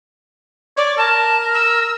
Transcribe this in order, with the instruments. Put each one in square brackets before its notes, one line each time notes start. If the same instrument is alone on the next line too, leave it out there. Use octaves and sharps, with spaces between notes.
[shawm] C#5 [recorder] D5
[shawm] A#4 [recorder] A5
[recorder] E6